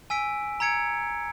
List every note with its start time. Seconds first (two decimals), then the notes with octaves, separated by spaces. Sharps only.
0.10 G#5 E6 B6 D7
0.60 A#5 E6 G#6 C#7 D7